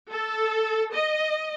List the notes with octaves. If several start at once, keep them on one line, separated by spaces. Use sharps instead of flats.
A4
D#5